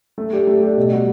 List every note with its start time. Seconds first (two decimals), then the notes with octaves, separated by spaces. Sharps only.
0.18 A3
0.33 D4 G4
0.47 A3
0.63 D4 G4
0.77 B2
0.92 G3 B3 F#4